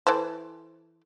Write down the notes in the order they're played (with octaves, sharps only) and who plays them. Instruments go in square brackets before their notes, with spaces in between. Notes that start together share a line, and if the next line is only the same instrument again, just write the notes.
[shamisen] E3 A4 C5